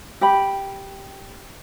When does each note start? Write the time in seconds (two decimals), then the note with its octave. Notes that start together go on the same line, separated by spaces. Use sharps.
0.21 G4 G5 B5